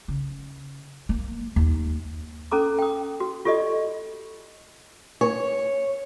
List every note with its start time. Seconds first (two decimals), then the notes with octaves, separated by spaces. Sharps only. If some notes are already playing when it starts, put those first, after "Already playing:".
0.08 C#3
1.09 A#3
1.56 D#2
2.51 C#4 A4 A#5 D6
2.79 G5 D#6
3.20 F#4
3.45 F4 G4 A4 D5 D#5
5.21 C#5